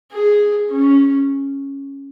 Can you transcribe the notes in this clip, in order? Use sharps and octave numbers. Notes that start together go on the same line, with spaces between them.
G#4
C#4